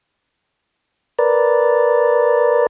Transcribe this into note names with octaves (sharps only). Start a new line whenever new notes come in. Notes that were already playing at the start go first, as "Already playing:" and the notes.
A#4 B4 D5